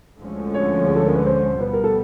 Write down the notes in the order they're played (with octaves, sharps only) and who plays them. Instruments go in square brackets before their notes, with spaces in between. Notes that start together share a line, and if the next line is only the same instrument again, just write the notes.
[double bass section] D2 D3 F3 G#3 C#4
[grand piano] C#5
G#4
A4
A#4
B4
C5
[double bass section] B2 G3 B3 [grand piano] B4
[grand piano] A#4
A4